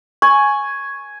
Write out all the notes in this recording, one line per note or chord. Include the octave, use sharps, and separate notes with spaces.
G#5 C#6